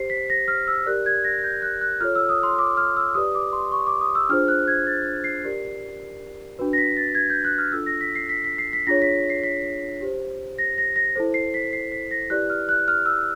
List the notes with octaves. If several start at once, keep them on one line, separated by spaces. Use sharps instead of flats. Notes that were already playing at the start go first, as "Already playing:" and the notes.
Already playing: G4 C5 C7
B6
A#6
F6
E6
G4 A#4 D5 F#6
G#6
A#6
G6
F#6
F#6
F4 A4 C#5 F6
E6
D#6
C6
D6
F6
E6
G4 B4 D5 D#6
D6
C6
C#6
D6
D#6
E6
D4 F4 G#4 C5 F6
F#6
G#6
A6
C7
G4 A#4 D5
D4 F#4 B4
A#6
B6
A6
G#6
G6
F#6
F6
D4 F4 A4 E6
A#6
B6
C7
B6
B6
C7
B6
D4 F4 G#4 C#5 A#6
B6
C7
B6
G4 C5
A#6
A#6
A#6
E4 A4 C5
C7
B6
C7
B6
A#6
E4 G4 B4 D5 F#6
F6
F#6
F6
E6